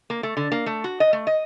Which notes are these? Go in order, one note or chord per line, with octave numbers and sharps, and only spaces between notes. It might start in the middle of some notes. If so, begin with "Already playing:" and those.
A#3
A3
D3
A#3
A3
F#4
D#5
A3
D#5